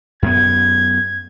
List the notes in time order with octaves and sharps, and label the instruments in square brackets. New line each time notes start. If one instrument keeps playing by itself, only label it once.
[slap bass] F#2 B3 [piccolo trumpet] G#6